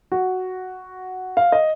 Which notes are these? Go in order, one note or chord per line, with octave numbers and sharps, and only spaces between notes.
F#4
F5
D#5